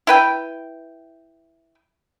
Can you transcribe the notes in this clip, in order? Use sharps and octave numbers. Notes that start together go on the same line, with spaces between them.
E4 B4 G5